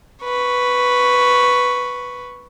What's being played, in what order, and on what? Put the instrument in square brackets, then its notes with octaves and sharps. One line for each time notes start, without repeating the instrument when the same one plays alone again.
[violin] B4 C#6